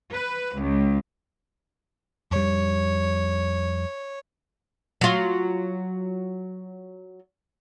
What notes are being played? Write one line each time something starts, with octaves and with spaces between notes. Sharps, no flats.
B4
C#2
F2 G3 C#5
F#3 F4